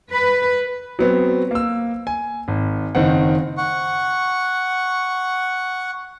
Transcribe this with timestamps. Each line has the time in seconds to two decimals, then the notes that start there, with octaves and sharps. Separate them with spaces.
0.11 B4
0.99 F#3 B3 C4
1.51 A#3 E6
2.07 G#5
2.48 G#1
2.95 F#1 D#3 C4 F#5
3.57 F#5 C#6